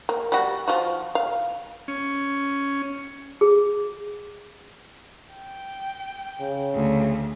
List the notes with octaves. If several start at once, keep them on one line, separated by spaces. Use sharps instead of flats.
A#3
G3 F#4
F3 F4 F#4
F5
C#4
G#4
G5
C#3
D2